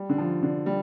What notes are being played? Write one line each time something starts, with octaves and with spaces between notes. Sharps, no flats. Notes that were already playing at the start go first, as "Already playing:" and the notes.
Already playing: G3
D3
F3
D3
G3